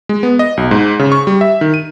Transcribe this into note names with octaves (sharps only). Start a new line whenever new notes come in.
G#3
B3
D#5
B1
G#2
C#3
C#6
G3
E5
D#3
D#7